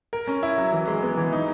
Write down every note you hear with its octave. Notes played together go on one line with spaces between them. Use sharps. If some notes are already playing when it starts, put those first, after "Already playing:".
A#4
C#4
E4
F#3
E3
G#3
B3
E3
D#4